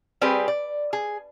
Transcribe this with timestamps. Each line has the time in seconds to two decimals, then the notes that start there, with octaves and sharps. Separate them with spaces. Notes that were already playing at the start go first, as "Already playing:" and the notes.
0.21 G3 C4 G4 G#4 B4 D5
0.48 D5
0.93 G#4